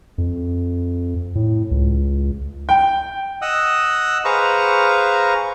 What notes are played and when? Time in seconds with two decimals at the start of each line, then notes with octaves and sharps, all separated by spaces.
0.18 F2
1.35 A2
1.71 C#2
2.69 G5
3.42 D#5 F#5 D#6 E6
4.25 G#4 B4 C5 F5 A#5 C#6